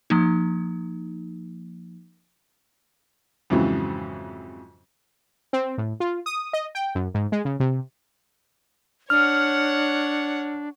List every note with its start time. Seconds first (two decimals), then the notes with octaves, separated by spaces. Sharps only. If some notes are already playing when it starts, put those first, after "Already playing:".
0.10 F3 A#3 D#4
3.50 F2 G#2 C#3 E3 F#3
5.53 C4
5.78 A2
6.00 F4
6.26 D#6
6.53 D#5
6.75 G5
6.95 F#2
7.14 G#2
7.32 G#3
7.45 C#3
7.60 C3
9.10 D4 C#5 F#5 F6